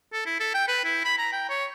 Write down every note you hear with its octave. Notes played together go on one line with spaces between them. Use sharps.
A4
E4
A4
G5
B4
E4
B5
A#5
G5
C#5